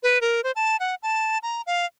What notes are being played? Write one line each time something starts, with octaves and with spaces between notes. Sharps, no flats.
B4
A#4
C5
A5
F#5
A5
A#5
F5